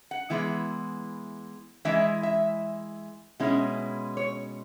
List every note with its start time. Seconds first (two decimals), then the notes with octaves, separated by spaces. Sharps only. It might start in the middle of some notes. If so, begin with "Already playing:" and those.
0.11 F#5
0.30 E3 G#3 B3 E4
1.85 E3 G#3 E4 E5
2.23 E5
3.40 B2 G#3 C#4 E4
4.17 C#5